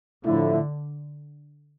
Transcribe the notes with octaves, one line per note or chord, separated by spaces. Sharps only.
A2 D3 F3 A3 E4